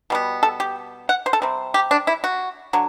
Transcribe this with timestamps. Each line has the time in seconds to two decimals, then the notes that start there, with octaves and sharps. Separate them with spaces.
0.10 B2 G3 B3
0.43 A4
0.60 G4
1.09 F#5
1.26 C5
1.33 A4
1.42 C3 G3 C4
1.74 G4
1.91 D4
2.07 E4
2.24 F#4
2.73 D3 F#3